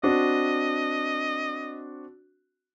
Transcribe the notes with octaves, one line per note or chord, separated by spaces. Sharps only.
C4 D4 F#4 D#5